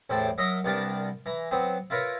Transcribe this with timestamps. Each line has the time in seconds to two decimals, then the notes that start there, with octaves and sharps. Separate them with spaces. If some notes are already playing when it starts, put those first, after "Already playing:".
0.10 A1 E2 A2 C5 G5 A5
0.38 F#3 A#4 D#5 E5 A#5 D#6
0.64 C2 B3 D4 G4 A#4 A5
1.26 E3 A#5
1.51 F#3 B3 C4
1.90 E4 F4 A#4 B4 C#5